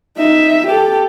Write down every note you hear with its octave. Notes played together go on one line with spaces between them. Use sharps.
D#4 E5
G4 A4